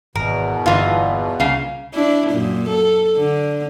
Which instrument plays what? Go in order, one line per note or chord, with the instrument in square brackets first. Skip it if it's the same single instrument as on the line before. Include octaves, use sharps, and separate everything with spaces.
[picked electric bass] G#1 [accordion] E2 B2 [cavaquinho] A#4
[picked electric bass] G1 [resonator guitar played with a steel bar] A#2 E3 D#4 [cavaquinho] F4
[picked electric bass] C2 [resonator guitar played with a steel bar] C#3 A#3 F5
[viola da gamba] D4 E4
F#2 A#2
A4
D3